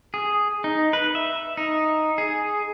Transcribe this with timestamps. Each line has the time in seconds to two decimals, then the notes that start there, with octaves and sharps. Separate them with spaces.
0.14 G#4
0.64 D#4
0.93 B4
1.15 E5
1.57 D#4
2.18 G#4